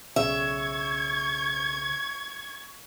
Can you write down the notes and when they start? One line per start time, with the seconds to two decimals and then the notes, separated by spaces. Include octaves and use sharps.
0.16 B1 C#3 E5 C#6 G#6